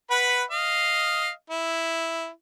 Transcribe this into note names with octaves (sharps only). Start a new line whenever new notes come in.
B4 F#5 B5
D#5 F5
E4